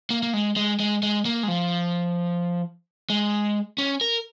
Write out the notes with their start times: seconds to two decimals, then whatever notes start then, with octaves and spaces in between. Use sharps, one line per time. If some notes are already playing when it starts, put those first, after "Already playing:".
0.10 A#3
0.23 A#3
0.34 G#3
0.56 G#3
0.80 G#3
1.03 G#3
1.25 A#3
1.43 G#3
1.48 F3
3.10 G#3
3.78 C#4
4.01 A#4